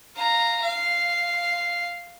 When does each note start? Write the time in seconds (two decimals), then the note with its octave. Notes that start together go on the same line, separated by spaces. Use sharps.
0.16 F5 A#5
0.62 F5